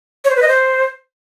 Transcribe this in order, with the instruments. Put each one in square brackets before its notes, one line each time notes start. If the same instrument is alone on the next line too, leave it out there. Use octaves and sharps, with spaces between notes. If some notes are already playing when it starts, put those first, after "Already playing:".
[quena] C#5
C5
B4
D#5
C5